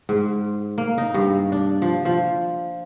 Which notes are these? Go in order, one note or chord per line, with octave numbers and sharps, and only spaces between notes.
G#2
A#3
D#4
G2
D4
F3
F3